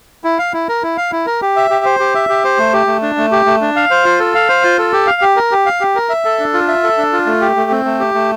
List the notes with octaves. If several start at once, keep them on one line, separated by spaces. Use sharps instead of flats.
E4
F5
E4
A#4
E4
F5
E4
A#4
G4
E5
G4
C5
G4
E5
G4
C5
A3
G4
A3
D4
A3
G4
A3
D4
F5
C5
F4
A4
F5
C5
F4
A4
G4
F5
G4
A#4
G4
F5
G4
A#4
E5
A4
D4
F4
E5
A4
D4
F4
A3
G4
A3
C4
A3
G4
A3